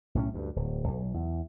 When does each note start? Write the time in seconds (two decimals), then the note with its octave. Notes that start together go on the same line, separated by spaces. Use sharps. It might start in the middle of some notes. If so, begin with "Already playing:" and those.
0.15 B1 A2 A3 C#4
0.34 D2 G2
0.56 D1
0.88 B1
1.14 E2